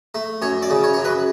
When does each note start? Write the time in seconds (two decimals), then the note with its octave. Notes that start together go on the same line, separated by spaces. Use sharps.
0.15 A3
0.42 F#2 C#5
0.62 D5
0.70 C#3
0.84 C#5
0.94 F#2 C#5
1.05 B4